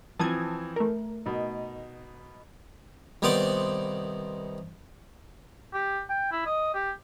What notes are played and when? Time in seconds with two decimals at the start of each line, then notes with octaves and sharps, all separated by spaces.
0.19 E3 F3 C4 A5 D#6 G#6
0.76 A3 A#4
1.26 B2 D#4
3.22 C2 D#3 B3 C5 D5
5.73 G4
6.10 G5
6.32 E4
6.46 D#5
6.74 G4